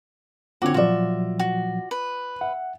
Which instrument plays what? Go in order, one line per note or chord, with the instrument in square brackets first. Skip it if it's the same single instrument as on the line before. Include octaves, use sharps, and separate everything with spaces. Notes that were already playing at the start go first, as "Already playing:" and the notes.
[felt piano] D3 C4 [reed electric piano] F4 D6 [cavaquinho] F#4 C#5
[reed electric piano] A#2 F3 F#3 [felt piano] F4 D5 [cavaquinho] F#4 E5
[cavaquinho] F#4
B4
[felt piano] E5 [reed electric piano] F#5